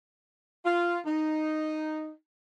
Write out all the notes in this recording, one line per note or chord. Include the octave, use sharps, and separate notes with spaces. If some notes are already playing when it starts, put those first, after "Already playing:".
F4
D#4